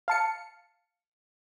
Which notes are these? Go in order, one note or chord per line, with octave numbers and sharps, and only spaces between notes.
F5 A5 C#7